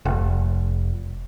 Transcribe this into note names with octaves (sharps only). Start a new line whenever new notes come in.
F1